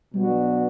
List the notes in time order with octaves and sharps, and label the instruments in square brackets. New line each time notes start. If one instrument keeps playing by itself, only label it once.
[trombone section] B2 F#3 B3 D4 F#4 [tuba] G3